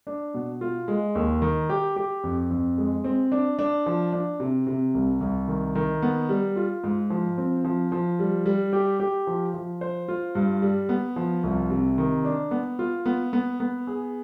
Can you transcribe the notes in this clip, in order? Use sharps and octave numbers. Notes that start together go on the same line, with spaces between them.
D4
B2
F4
G#3
D#2
D#3
G4
G4
F2
F2
G#3
C4
D4
D4
F3
D4
C3
C3
C2
C2
D#3
D#3
B3
G3
F4
G#2
F3
C4
F3
F3
G3
G3
G4
G4
F3
F3
C5
F4
G2
G3
B3
F3
C2
C3
D#3
D4
B3
F4
B3
B3
B3
G#4